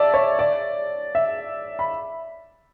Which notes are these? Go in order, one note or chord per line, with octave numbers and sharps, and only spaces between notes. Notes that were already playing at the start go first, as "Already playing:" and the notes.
Already playing: D5 E5 A5
C#5
D5
E5
B5